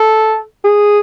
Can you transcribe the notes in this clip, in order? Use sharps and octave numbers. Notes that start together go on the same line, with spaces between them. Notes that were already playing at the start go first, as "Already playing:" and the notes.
Already playing: A4
G#4